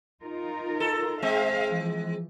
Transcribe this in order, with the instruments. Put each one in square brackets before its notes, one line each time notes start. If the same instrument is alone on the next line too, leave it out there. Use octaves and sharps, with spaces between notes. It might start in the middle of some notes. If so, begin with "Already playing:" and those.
[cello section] D#4 F4 A#4
[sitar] A4
[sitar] G#3 C4 [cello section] E5 F5
[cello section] E3 F3